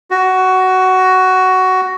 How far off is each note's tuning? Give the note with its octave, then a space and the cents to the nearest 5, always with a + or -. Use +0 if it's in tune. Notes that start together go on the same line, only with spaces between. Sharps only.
F#4 +10